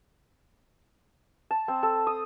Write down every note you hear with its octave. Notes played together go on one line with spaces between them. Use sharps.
A5
C4
A4
D#6